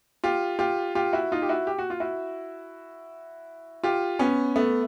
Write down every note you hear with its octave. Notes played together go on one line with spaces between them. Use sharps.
F4 G4
F4 G4
F4 G4
E4 F#4
D#4 F4
G4
E4 F#4
G4
F#4
F4
E4 F#4
F4 G4
B3 C#4
A3 B3